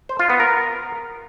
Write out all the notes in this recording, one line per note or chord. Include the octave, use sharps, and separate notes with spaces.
C5
F4
B3
A#4